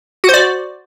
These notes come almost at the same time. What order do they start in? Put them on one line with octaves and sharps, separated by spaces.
F#4 C5 D5